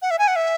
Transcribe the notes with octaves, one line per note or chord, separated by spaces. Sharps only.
F#5
E5
G#5
F#5
E5